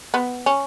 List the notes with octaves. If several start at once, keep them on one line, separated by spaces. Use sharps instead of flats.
B3
C#4